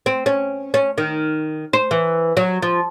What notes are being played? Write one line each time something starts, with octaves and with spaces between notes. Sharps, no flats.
C4
C#4
C#4
D#3
C5
E3
F#3
F3